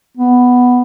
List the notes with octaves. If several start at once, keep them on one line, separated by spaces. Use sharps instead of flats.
B3